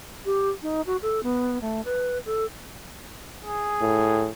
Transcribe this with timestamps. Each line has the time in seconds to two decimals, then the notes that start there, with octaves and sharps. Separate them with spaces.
0.25 G4
0.62 D#4
0.86 F#4
1.02 A4
1.23 B3
1.61 A3
1.85 B4
2.25 A4
3.45 G#4
3.81 A2